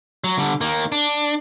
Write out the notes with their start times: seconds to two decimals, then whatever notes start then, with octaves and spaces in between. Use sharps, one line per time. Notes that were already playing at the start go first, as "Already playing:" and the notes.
0.24 F#3
0.38 D3 G3
0.61 D#3 A#3
0.92 D4